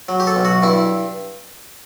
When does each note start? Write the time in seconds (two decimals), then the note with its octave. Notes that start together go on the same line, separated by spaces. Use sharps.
0.09 F#3
0.20 G4
0.27 A4
0.36 B1
0.45 F#4
0.62 G2 E4